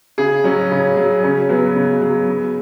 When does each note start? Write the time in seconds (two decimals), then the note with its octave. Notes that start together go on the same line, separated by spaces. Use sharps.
0.18 C#3 G#4
0.44 F#3 C#4
0.71 C#3
0.97 F#3
1.24 C#3 C#4
1.49 F#3 B3
1.76 C#3
2.01 F#3
2.29 C#3